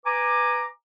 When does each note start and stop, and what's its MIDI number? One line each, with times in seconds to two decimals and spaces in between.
0.05 0.66 71
0.05 0.66 80
0.05 0.66 82
0.05 0.66 86